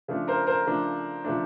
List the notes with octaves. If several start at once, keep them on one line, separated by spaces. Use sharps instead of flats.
C#3 F3 A3 D4
A#4 C5
A#4 C5
C#3 F3 A3 D4
C#3 F3 A3 D4